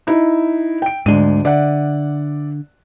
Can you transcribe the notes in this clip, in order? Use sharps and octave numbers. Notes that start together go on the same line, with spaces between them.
D#4 E4
G5 D7
D2 G#2 G#3 D4 D#7
D3 D5 E5 F#5